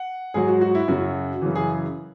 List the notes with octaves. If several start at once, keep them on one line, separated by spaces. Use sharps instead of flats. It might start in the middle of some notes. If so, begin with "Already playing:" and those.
Already playing: F#5
G#2 F#3 G#4
F#4
F#4
E4
F#2 C#3 F#3 F#4
F#2 C#3 E3
G#4